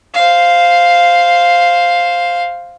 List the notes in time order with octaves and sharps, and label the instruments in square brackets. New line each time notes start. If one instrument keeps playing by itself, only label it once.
[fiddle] C5 F5